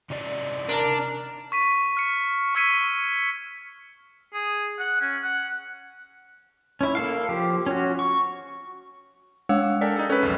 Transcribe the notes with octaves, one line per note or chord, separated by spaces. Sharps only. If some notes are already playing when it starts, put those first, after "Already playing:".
C3 D#4 D5
D4 A#4
C#6 B6 D#7
F6 C#7
C#6 E6 G#6 B6 C#7 D#7
G#4
F#5
C#4
F#5
C#4 E4
A#3 A4 F5
F3 G4
C#4 F#4
C#6
G#3 C#5 F#5 E6
A4 A#4 D5 G5
D#4 G#4 A4
C#4 A4 B4 E6
B1 F2